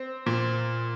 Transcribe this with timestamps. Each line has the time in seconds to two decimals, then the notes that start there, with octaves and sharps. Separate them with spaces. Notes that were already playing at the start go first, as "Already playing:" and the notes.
Already playing: C4
0.26 A#2